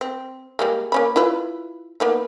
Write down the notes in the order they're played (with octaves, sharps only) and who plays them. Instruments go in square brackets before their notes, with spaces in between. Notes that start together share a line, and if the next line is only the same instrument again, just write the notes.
[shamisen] C4
G3 G#3 A#3
A#3 C#4 B5
E4 F4 B4
A#3 B3 D#4